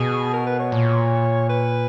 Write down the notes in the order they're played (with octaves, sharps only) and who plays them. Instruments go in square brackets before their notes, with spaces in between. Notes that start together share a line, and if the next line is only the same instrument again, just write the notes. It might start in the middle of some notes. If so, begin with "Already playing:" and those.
Already playing: [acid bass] B2 [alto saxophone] G#4
[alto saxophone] A#4
B4
C#5
[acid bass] A#2
[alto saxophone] B4